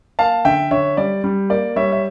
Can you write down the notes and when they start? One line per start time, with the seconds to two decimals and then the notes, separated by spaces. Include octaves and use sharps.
0.19 A#3 F5 A5
0.45 D3 E5 G5
0.71 D3 C#5 E5
0.97 G3 D5
1.24 G3
1.50 A#3 D5
1.76 G3 C#5 E5
1.92 E5